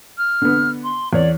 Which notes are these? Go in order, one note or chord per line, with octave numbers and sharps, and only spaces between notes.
F6
D3 B3
C6
E2 C#5 D5